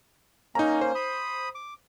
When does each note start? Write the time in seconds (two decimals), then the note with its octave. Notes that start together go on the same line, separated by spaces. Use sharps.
0.55 A#3 C#4 D#4 A#5
0.81 C5
0.95 B5 D#6
1.55 D6